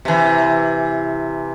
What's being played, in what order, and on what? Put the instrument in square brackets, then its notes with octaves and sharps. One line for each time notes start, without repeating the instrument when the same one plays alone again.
[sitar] C3 E3